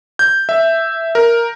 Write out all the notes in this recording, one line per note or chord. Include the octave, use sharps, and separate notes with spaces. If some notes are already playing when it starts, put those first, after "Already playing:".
G6
E5
A#4